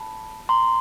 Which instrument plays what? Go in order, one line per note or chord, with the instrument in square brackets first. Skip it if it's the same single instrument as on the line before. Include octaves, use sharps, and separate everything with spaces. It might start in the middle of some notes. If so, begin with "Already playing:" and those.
Already playing: [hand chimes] A5 B5
A#5 C6